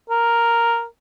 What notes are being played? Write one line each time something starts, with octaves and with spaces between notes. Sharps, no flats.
A#4